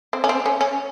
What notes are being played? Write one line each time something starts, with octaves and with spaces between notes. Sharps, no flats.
C4
C#4
C4
C#4
C#4